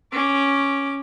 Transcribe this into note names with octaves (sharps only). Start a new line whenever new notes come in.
C#4 D6